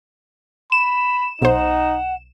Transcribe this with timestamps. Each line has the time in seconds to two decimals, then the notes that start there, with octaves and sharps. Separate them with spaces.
0.72 B5 E7
1.42 B1 D#4 C5 F#5